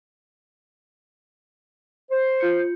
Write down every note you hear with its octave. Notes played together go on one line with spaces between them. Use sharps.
C5
F4 G6 C#7